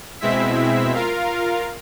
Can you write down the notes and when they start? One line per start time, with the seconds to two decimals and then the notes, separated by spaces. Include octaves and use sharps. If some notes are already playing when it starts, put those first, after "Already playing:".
0.20 B2 G#3 C4 E4 E5 B6
0.94 F4 A#4 F5